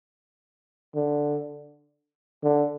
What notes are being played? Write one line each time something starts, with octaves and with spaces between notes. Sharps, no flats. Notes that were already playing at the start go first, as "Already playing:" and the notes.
D3
D3